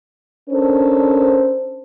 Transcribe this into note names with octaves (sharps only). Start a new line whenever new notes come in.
C#4 D4 A4 A#4 C5